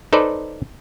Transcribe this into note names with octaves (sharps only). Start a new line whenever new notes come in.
D#4 A4 B4 C5 D5